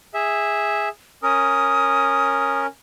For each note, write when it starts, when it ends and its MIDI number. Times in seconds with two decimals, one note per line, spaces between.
0.14 0.89 68
0.14 0.89 76
1.23 2.67 61
1.23 2.67 70
1.23 2.61 87